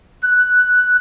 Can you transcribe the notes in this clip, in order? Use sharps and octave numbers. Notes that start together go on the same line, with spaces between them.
F#6